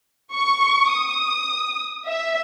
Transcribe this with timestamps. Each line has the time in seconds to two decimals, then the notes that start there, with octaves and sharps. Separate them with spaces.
0.33 C#6
0.91 D#6
2.07 E5